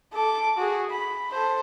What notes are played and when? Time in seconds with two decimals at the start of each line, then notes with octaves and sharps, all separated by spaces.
0.14 A4 D6
0.58 F#4 G#4
0.91 B5
1.31 A4 C5